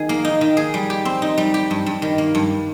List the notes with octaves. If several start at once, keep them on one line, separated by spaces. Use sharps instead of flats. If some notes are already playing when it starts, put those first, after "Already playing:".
Already playing: D#3 G#4
A#3
D#4
D#3
G#4
G3
G4
C4
D#4
G3
G4
G2
G2
D#3
A#3
G2